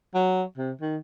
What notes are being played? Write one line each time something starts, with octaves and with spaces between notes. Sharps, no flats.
F#3
C3
D#3